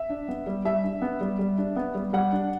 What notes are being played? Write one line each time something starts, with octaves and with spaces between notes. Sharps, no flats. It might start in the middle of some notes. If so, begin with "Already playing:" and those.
Already playing: E5
D4
B3
G3
G3 E5
D4
B3
G3
G3
D4
B3
G3
G3 F#5
D4